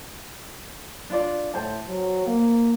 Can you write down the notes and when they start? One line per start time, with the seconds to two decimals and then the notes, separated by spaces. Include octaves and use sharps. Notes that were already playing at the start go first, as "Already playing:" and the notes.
1.10 D4 F4 D5
1.54 A2 C5 A5
1.87 F#3
2.26 A#3